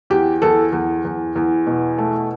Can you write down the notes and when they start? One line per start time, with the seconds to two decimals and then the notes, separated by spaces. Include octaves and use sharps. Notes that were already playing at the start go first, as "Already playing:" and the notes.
0.10 E2 G4
0.42 E2 A4
0.72 E2
1.05 E2
1.36 E2
1.67 B2
1.98 A3